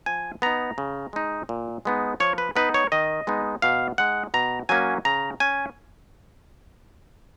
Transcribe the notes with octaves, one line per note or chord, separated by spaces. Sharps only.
F3 G#5
B3 D#4 A#5
C#3
G#3 D#4
A#2
G#3 B3 D#4
F3 C#5
B4
B3 D#4 B4
C#5
D#3 D#5
G#3 B3 D#4
B2 F5
G#3 D#4 F#5
B2 A#5
F#3 A#3 C#4 G#5
C#3 A#5
C#4 G#5